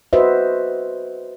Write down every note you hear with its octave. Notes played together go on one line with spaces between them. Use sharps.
F#4 B4 C5 D#5 E5